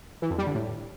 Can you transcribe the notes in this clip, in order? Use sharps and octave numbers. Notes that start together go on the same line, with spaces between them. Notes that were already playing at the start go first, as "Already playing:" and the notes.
E3
F2
G3
D3
A2